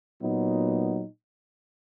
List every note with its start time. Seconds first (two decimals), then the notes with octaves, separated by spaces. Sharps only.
0.22 A#2 F#3 B3 D#4